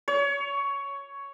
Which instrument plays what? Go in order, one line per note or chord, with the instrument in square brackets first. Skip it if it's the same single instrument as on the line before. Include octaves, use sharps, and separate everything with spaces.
[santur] C#5